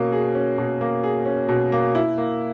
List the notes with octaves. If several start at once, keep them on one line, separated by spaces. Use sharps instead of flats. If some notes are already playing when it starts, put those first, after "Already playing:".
Already playing: B2 A#3 C#4
G#4
C#4
B2
A#3
G#4
C#4
B2
A#3
E4
A#3